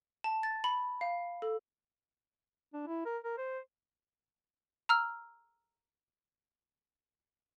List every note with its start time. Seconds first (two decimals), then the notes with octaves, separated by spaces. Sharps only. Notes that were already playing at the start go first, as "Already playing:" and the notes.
0.24 A5
0.43 A6
0.64 B5
1.01 F5
1.42 A4
2.74 D4
2.87 E4
3.05 A#4
3.24 A#4
3.38 C5
4.89 A#5 E6 F6